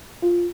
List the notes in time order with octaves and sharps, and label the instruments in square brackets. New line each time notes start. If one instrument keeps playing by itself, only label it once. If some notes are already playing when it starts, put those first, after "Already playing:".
[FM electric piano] F4